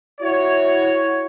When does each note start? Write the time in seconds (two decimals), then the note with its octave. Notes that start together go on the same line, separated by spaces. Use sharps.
0.21 E4 F#4 C#5